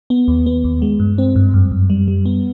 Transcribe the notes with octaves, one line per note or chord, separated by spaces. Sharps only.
B3
D#2
B3
D#2
G#3
G2
C4
G2
F#2
F#2
G3
G3
B3